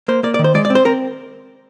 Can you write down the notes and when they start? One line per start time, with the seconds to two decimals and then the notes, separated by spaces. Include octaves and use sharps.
0.08 A#3 C5
0.23 A#3 D5
0.34 D5
0.39 D#3
0.44 C5
0.54 G#3 D5
0.65 D5
0.70 C4
0.75 C5
0.85 C4 A#4